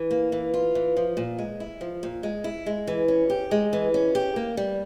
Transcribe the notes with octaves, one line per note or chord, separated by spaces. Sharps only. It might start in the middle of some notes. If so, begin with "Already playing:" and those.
Already playing: E3
A#3
E3
F4
E3
F3
A#2
G#3
E4
F3
A#2
G#3
E4
G#3
E3
C#4
G4
G#3
E3
C#4
G4
A#3
G3